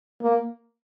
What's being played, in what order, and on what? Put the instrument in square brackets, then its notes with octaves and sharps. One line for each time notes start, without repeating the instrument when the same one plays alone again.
[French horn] A#3